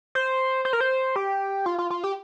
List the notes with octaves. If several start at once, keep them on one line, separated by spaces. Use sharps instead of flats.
C5
C5
A#4
C5
G4
F4
F4
F4
G4